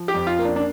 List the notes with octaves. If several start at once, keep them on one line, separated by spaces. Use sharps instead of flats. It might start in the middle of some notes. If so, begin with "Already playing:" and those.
Already playing: F3
G4
F2
F4
A#3
D4
D4